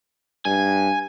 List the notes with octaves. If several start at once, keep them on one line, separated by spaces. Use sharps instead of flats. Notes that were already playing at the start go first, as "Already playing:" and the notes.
G2 G#5